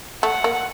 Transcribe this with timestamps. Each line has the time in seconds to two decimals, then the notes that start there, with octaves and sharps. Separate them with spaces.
0.23 A3 F#5
0.44 A#3